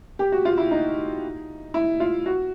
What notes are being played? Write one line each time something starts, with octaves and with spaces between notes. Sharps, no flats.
G4
F#4
F4
E4
D#4
E4
F4
F#4